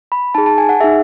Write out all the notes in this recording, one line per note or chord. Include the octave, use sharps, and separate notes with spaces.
B5
D#4 G#4 A5
A5
G#5
F#5
D#4 G#4 E5